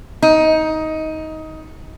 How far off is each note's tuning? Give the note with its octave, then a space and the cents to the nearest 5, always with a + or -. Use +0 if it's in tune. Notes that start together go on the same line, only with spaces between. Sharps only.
D#4 +15